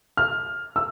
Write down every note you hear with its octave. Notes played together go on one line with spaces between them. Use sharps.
F6
E6